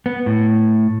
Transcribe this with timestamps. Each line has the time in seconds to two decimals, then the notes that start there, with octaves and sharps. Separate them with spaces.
0.06 B3
0.26 A2